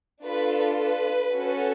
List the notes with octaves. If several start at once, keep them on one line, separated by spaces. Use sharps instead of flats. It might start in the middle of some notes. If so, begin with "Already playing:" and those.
D4 F4 A4 B4
B4
C#4 F#4 A4